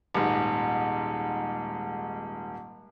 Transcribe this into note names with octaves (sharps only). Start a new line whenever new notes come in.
D#1 G#2